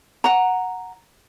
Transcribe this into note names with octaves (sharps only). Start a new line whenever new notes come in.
F#5 A#5